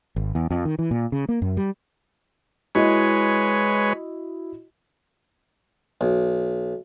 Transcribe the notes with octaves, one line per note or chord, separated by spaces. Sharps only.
G#1
E2
F2
D#3
E3
A#2
C#3
A#3
F#2
G3
G#3 E4 F#4 B4 C#5 D#5
B1